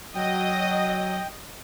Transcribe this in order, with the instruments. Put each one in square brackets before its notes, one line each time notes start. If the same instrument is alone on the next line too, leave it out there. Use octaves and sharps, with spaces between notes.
[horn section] F#3 [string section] D#5 [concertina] G5